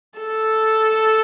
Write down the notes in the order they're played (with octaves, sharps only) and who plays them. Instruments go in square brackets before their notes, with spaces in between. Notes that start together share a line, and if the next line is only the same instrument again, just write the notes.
[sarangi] A4